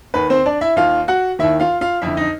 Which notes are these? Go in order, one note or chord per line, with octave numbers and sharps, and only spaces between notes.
D#2 D#3 B4
C4 C5
D4 D5
E4 E5
D#2 D#3 F4 F5
F#4 F#5
D#2 D#3 E4 E5
F4 F5
F4 F5
F2 D3 E4 E5
D#4 D#5